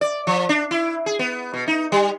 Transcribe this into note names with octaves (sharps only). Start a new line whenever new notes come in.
D5
F3
D4
E4
G#4
B3
B2
D#4
G3